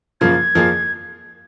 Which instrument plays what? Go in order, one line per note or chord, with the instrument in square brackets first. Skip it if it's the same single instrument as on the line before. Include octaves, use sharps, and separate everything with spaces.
[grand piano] F#2 C#3 F3 A#3 F4 [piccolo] G#6
[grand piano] F2 F3 A#3 F4 G#4